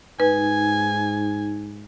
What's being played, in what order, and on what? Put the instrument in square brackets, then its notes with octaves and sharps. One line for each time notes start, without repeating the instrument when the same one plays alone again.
[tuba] G#2 [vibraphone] D#4 [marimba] B4 [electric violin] G#5